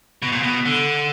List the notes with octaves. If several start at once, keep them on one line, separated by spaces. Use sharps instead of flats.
B2
A#2
B2
D3